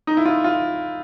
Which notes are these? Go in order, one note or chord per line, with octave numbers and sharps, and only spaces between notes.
D#4
E4
F4
F4